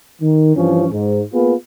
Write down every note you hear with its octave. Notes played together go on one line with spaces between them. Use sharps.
D#3
G2 E3 F3 C#4
G#2
A#3 B3 F4 G#4 B4